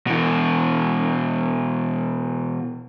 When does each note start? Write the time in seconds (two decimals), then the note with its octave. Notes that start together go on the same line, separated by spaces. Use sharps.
0.07 B2 E3